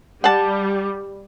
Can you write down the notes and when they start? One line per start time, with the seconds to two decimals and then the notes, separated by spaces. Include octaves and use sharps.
0.24 G3 F#5 A5